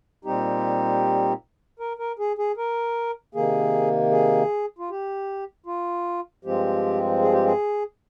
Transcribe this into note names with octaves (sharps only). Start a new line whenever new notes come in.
A#2 G3 C4 D#4 G4
A#4
A#4
G#4
G#4
A#4
C3 D#3 A#3 G#4
G#4
F4
G4
F4
G2 F3 G#3 C4 G4
G#4
G4
G#4